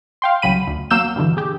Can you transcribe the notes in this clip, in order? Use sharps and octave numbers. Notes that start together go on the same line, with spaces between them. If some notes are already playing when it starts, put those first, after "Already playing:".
F5 G5 C6
C2 C#3 F#3 B5 D#7
D2
F#3 A#3 F5 E6 G6 E7
G2 B2 D3 E3
G4 G#4